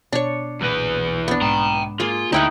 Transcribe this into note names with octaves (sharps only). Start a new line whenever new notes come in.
B2 D4 C#5
B1 E2 A#2 B4
B3 D4
G#2 G5 A#5
A#3 F4 G#4
D2 A2 D#4 E4 F#5 G5